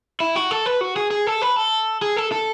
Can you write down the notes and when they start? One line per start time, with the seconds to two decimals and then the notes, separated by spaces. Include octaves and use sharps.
0.20 E4
0.35 F#4
0.51 A4
0.66 B4
0.81 F#4
0.96 G#4
1.11 G#4
1.27 A4
1.42 B4
1.56 A4
2.02 G#4
2.17 A4
2.32 A4